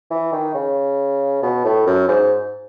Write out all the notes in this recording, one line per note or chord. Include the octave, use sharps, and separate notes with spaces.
E3
D#3
C#3
B2
A2
F#2
G#2